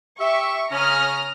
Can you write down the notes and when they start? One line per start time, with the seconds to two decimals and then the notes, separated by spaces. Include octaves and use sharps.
0.19 G4 E5 C#6
0.71 C#3 C#4 A#5 D#6 F6